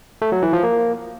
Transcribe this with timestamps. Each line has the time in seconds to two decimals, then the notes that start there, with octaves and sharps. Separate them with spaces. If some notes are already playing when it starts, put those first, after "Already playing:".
0.22 A3
0.32 F#3
0.43 E3
0.53 F3
0.63 A#3